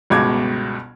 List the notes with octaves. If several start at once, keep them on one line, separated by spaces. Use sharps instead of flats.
G1 C#2 B2 D6 G#6